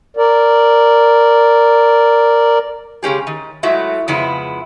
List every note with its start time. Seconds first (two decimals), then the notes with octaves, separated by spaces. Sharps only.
0.17 A#4 D5
3.03 C#3 G#3 C#4 G4 G#4
3.27 D#3
3.63 F#3 G#3 A3 E4 F#4 E5
4.08 F2 C#3 G#3 B3 E4